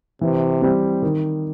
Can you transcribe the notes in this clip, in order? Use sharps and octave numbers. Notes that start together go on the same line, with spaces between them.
C3 E3
G3 C4
D#3